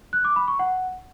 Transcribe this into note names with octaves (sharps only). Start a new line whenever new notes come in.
F#6
D6
B5
C#6
F#5